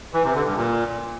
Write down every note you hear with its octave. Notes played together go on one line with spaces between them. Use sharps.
E3
C3
D3
G2
A#2